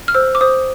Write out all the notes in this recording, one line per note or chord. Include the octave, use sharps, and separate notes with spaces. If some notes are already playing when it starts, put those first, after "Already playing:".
F6
C5 E6
D6
C5 D#6